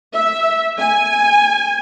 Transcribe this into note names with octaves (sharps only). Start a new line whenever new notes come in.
E5
G#5